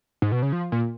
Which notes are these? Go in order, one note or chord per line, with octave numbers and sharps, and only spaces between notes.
G#2
B2
C#3
F3
A#2